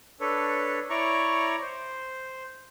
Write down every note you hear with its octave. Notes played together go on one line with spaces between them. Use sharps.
D4 A4 B4 C#5
E4 C#5 D5 A#5 C#6
C5